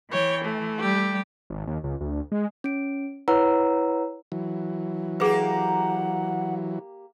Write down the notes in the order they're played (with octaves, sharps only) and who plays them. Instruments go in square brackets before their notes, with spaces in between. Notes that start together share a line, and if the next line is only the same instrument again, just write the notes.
[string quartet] E3 [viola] C#5 G5
[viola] A3
[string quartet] G3 G4
[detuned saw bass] G#1
D#2
C#2
D2
G#3
[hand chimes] C#4 D7
E4 B4 C#5 F#5 A#5 E6
[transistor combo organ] E3 F#3
[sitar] A#3 G4 [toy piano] G#4 B4 [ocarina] F#5